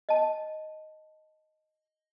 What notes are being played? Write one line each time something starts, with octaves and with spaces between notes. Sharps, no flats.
D#5 A5